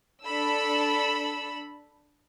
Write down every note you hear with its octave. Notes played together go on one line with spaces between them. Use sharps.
D4 A4 B5 E6